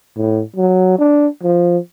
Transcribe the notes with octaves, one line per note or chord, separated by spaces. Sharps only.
A2
F#3
D4
F3